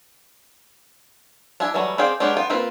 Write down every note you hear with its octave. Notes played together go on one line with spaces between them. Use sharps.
D4 E4 G4 G#5
E3 F#3 G3 A3
C4 G#4 D5 F5 G5
G#3 B3 C#4 D4 G4
B3 F4 G5
A#3 C4 F4 B4